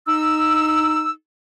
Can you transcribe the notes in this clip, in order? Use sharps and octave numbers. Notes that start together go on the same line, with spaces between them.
D#4 E6